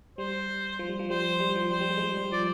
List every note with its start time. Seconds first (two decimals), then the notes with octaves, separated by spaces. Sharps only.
0.18 G3 C5
0.79 F3
0.89 G3
0.99 F3
1.10 G3 C5
1.40 G3
1.55 F3
1.71 G3 C5
1.81 G3
1.91 G3
1.97 G#3
2.01 G3
2.17 G3
2.32 F3 D5